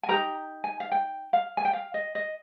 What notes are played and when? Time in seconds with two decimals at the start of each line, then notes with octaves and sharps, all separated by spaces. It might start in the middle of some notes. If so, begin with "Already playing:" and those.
0.03 G#5
0.09 D#4 G4 A#4 A#5
0.64 G#5
0.80 F5
0.92 G5
1.33 F5
1.57 G#5
1.65 G5
1.73 F5
1.94 D#5
2.15 D#5